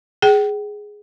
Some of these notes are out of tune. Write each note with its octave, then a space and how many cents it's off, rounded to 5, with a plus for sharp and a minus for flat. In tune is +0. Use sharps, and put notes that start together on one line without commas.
G#4 +0 G5 -40